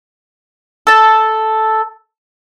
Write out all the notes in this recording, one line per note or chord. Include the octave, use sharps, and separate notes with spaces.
A4 A5